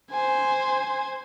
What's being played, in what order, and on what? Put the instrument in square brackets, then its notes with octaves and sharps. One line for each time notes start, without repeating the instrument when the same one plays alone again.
[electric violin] C5 G#5